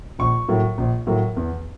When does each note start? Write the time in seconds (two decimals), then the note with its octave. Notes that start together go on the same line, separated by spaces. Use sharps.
0.19 A#1 C#6
0.48 A2 F#3 A#3
0.78 A#1
1.07 A2 F#3 A#3
1.36 E2